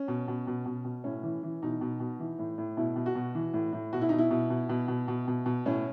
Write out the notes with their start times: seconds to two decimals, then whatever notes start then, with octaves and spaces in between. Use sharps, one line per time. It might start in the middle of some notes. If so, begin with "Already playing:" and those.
Already playing: C#4
0.08 B2
0.28 B2
0.47 B2
0.66 B2
0.85 B2
1.04 A2 C#4
1.23 E3
1.43 E3
1.62 B2 D#4
1.81 B2
2.00 B2
2.20 E3
2.39 A2
2.58 A2
2.77 B2 E4
2.96 B2
3.06 F#4
3.15 B2
3.35 E3
3.54 A2
3.73 A2
3.93 B2 F#4
4.01 E4
4.09 B2 D#4
4.18 E4
4.31 B2
4.50 B2
4.69 B2
4.88 B2
5.08 B2
5.28 B2
5.46 B2
5.66 A2 C#4